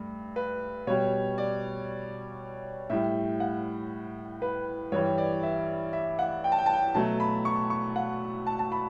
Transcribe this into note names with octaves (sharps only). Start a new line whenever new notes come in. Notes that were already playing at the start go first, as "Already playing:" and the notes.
Already playing: G2 A3
B4
B2 G3 C#5
D5
A2 G3 E5
F#5
B4
G2 E3 G3 C#5
D5
E5
E5
F#5
G5
A5
G5
A5
G5
B2 F#3 A3 A5
B5
C#6
C#6
F#5
A5
A5
B5